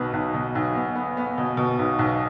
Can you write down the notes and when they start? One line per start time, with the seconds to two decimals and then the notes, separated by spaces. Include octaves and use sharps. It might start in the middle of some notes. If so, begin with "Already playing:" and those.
Already playing: B1 B2 B4
0.13 B1
0.34 B2
0.55 B1
0.75 B3
0.95 B3
1.17 B3
1.38 B2
1.57 B2
1.79 B1
1.99 B1